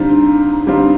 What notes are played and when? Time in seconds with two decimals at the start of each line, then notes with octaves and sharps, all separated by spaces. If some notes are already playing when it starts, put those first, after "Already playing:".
Already playing: D3 G3 C4 D#4 F4
0.67 D3 G3 C4 F4